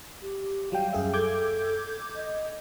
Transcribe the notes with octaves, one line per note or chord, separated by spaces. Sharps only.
G4
F#3 G3 F5 G5
F#2 G#4 E5
A4 D6 G6 G#6
D#5